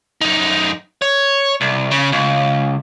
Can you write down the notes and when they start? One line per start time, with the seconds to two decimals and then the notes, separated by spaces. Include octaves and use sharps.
0.21 F#2 D#4
1.02 C#5
1.61 C2
1.91 C#3
2.12 C#2